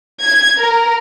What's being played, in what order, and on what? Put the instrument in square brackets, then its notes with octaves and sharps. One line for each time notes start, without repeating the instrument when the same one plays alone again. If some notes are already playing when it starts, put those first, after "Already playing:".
[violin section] G#6
A#4